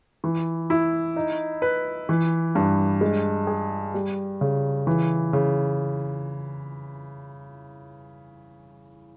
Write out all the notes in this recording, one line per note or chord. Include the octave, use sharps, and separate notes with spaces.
E3
E4
D#4
B4
E3
G2
G#3
G#4
G3
C#3
E3
C#3